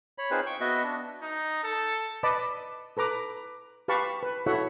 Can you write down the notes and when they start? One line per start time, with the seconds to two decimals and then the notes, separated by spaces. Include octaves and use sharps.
0.18 C#5 B5
0.31 C4 D#4 F4 G#4 B4 C5
0.46 G5 C#6
0.61 B3 F#4 D#5 E5
0.84 D4
1.22 D#4
1.63 A4
2.23 B4 D5 D#5 A5 B5 D6
2.97 A4 B4 A#5 D6
3.88 G4 B4 F5 A5 B5 C#6
4.23 B4
4.46 E4 F#4 A4 C#5 E5 F#5